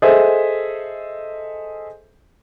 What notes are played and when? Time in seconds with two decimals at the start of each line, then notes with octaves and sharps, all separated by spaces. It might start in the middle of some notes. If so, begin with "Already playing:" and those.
0.02 G#4 A4 C5 D#5 E5